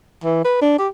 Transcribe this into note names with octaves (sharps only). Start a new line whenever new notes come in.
E3
B4
D4
G4